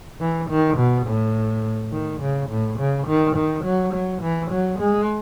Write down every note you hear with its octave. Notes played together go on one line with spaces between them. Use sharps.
E3
D#3
B2
A2
D#3
C#3
A2
C#3
D#3
D#3
F#3
F#3
E3
F#3
G#3